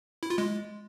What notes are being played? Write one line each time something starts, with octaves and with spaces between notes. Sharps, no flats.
E4
F4
G#3